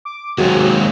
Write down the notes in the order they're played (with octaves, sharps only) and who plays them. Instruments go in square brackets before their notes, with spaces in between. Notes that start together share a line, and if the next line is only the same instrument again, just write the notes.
[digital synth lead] D6
[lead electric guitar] D#2 C3 [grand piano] F#3 [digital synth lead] G#3 [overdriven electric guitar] F#4 G#4